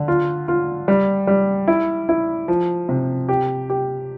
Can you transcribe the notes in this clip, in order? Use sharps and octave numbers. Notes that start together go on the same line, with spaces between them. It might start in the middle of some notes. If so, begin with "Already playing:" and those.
Already playing: D3
F4
F4
G3
G3
E4
E4
F3
C3
G4
G4